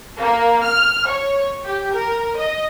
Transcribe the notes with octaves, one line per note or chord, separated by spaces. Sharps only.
A#3
F6
C#5
G4
A#4
D#5